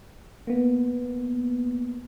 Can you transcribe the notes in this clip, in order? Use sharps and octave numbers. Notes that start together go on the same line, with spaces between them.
A#3 B3